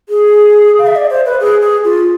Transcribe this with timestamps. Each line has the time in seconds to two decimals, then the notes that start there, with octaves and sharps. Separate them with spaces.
0.09 G#4
0.79 F5
0.87 E5
0.96 D5
1.10 C5
1.26 B4
1.40 G#4
1.62 G#4
1.84 F4